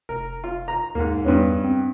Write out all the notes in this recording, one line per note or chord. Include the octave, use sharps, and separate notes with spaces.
F1 A#4
F4
A#5
D#2 G#2 A#3
E2 G2 B3 C#4
C4